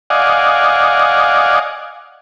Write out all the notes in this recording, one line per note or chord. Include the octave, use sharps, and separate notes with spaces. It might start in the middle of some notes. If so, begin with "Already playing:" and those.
D5 D#5 F5 F#5 G#5